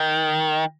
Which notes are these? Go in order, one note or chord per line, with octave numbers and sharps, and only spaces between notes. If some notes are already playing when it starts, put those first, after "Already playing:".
Already playing: D#3